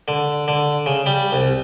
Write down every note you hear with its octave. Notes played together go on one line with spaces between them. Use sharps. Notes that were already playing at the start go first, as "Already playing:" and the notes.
D3
D3
C#3
G3
C2